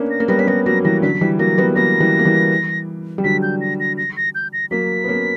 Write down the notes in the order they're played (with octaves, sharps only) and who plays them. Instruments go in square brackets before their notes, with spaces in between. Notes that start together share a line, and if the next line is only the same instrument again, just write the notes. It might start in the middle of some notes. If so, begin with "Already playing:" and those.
Already playing: [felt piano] A#3 B3 C#4 D4
[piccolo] A#6
[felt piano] A#3
[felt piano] G3 B3 [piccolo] A#6
[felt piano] C#4 [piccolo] B6
[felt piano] G3 B3 [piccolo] A#6
[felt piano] F#3 A#3 [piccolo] A#6
[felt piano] E3 G3 [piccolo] A#6
[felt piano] D3 F#3 [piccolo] B6
[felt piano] E3 G3
[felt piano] F#3 A#3 [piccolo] A#6
[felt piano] G3 B3
[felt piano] F#3 A#3 [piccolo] A#6
[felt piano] E3 G3
A#3
E3 G3
G3
[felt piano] D3 F#3 [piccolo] B6
[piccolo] G6
A#6
A#6
A#6
A#6
G6
A#6
[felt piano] F#3 A#3 [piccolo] B6
[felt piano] B3
A#3 C#4